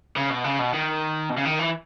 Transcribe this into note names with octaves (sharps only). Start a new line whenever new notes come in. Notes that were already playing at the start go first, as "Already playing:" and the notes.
C#3
B2
C#3
B2
D#3
B2
C#3
D#3
E3